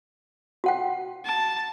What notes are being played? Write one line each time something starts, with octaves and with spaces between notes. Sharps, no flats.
F#4 F#5 G5
A5